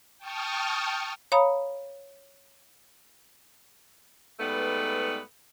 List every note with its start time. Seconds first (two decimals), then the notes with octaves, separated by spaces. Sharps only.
0.18 G5 A5 C#6 D#6 F6
1.32 C#5 F5 A#5 B5 D#6
4.39 G#2 G3 A3 B3 B4